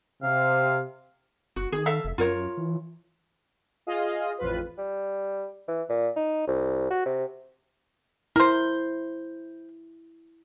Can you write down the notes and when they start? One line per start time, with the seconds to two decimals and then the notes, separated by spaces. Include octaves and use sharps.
0.23 C3 F5
1.56 F#1 F#4
1.72 D#3 G#4
1.86 A4 E5 F5
2.04 F1
2.18 F#2 F4 A#4 C#5
2.57 E3
3.87 F4 G#4 D#5 F5
4.38 A1 F2 F4 B4
4.78 G3
5.68 E3
5.89 A#2
6.16 D#4
6.47 C2
6.90 F#4
7.06 C3
8.36 E4 A#4 C5